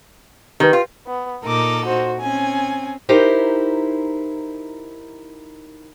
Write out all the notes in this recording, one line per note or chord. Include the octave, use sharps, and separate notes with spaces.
D#3 G4 B4
F4
B3
A#2 D#4 A4 A#4 D6
F#4 C5
C4 C#4 G#5
D#4 E4 G4 A#4 C5